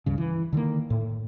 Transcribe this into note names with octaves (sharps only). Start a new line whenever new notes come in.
C#2 G2 C#3
E3
D3 D#3 A3 A#3
A2